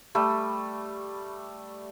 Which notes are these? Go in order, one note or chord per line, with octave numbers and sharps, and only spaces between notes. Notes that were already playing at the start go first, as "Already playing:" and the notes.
G3 A3